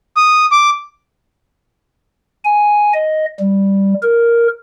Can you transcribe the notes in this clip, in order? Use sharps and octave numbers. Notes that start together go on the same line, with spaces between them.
D#6
D6
G#5
D#5
G3
A#4